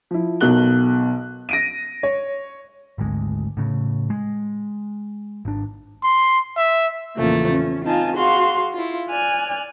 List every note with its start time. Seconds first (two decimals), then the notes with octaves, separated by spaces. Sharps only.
0.11 F3 E4
0.41 B1 B2 F#4 A#4 F#6 G7
1.49 A#6 D7 D#7
2.03 C#5
2.98 G#1 D2 G#3
3.57 A2 C#3
4.10 G#3
5.45 G#1 D4
6.03 C6
6.57 E5
7.17 E2 A#2 C#3 F3 A3 A#3
7.53 C#4
7.84 C4 D#4 F4 G#5 A5
8.16 F#4 G#4 F5 C6
8.73 E4 F4
9.09 D5 G#5 F6 F#6